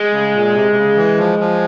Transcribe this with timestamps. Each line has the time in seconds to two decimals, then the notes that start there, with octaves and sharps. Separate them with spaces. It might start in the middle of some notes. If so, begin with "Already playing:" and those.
Already playing: G#3
0.12 C#3
0.34 A#2
0.55 C3
0.72 C3
0.76 C#3
0.97 E3
1.18 F3
1.39 F3